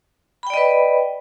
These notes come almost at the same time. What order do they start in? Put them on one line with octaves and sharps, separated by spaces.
B5 G5 D5 D#5 B4